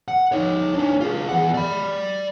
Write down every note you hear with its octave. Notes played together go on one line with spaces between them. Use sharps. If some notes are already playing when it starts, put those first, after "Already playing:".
F#5
D#4 C#5
D4 C#5
F4 G#4
E2 F#5
D5 B5